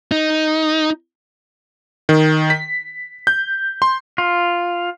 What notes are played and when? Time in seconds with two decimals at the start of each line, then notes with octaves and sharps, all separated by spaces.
0.12 D#4
2.09 D#3
2.50 B6
3.27 G6
3.82 C6
4.18 F4